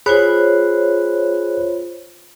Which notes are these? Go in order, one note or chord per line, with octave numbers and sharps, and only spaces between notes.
F4 G#4 C5 C#5 B5 F#6